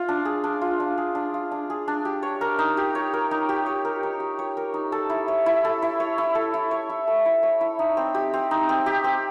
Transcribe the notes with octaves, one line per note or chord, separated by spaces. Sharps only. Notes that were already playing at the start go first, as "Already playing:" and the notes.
Already playing: F4
D4
G#4
D4
F4
D4
G#4
D4
F4
D4
G#4
D4
G4
C#5
A#4
D#4
G4
C#5
A#4
D#4
G4
C#5
A#4
D#4
G4
C#5
A#4
D#4
A4
E4
C#5
E4
A4
E4
C#5
E4
A4
E4
C#5
E4
A4
E4
C#5
E4
D#4
C4
G4
C4
D#4
C4
G4
C4